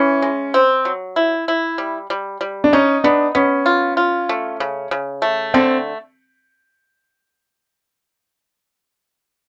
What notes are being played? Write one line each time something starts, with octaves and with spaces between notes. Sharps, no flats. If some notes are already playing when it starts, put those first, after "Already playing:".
Already playing: E3 C#4
G#3
C4
F#3
E4
E4
G3
G3
G3
D4
C#4 D#4
B3 D4
B3 C#4
F4
F4
A3
C#3
C#3
A3
D3 C4